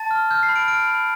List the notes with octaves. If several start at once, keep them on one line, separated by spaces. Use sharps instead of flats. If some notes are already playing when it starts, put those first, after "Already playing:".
Already playing: A5 A6
F6
F6 G6
C7
B5
D7
F6 D7
B5